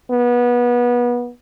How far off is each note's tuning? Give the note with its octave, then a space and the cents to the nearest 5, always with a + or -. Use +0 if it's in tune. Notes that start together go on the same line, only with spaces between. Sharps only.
B3 -25